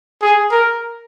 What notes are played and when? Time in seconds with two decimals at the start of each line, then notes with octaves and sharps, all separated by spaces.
0.22 G#4
0.51 A#4